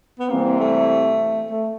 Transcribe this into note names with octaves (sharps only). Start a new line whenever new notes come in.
B3
C3 E3 G3 A#3 C4
A3
A3